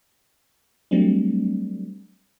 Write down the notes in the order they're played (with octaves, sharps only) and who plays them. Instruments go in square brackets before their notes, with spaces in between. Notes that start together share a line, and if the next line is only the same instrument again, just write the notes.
[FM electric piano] F#3 G3 A3 C4 D4